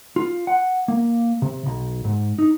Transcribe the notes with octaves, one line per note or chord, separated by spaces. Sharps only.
F4
F#5
A#3
C3
B1
G#2
D#4